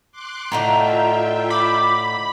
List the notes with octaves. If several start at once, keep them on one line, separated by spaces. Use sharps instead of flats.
C6 D6 F#6
A2 D3 D#4 F4 E5 G5 A#5
B5 D6